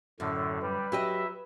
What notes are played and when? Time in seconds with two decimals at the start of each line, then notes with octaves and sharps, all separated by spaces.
0.20 F#2 A2 D3
0.62 G3 B4
0.92 F#3 G4 D#5 E5